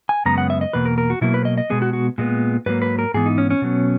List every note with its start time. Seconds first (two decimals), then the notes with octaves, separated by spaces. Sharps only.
0.09 G#5
0.25 F#2 C#3 G#3 B3 A#5
0.38 F#5
0.50 E5
0.61 D#5
0.73 E2 B2 A#3 B4
0.85 A#4
0.98 A#4
1.10 F#4
1.21 B2 F#3 A#3 E4
1.34 B4
1.45 D#5
1.58 D#5
1.70 B2 G#3 B3 G#4
1.82 F#4
1.93 F#4
2.18 A#2 G#3 B3
2.66 G#2 F#3 A#3 B4
2.82 B4
2.99 A#4
3.14 G#2 E3 B3 G#4
3.26 D#4
3.38 C#4
3.50 C#4
3.62 B2 F#3 B3